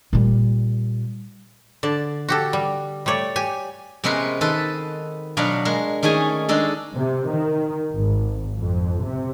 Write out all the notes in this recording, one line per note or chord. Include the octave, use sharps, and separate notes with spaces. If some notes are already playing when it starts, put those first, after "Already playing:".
A#2 G3
D3 D5 A5
F#4 G4 A4
G3
G3 A3 C#5 D5
G4 G#5
C3 G#3 B3 C#4 A#4 B4
D#3 A4 B4 A5 C6
B2 F#3 B3 D4 F5 G5
G#3 A#4
D#3 A3 C#4 G#4 G#5
G#3 D4 D#4 A4
C3
D#3
G#1
F2
C3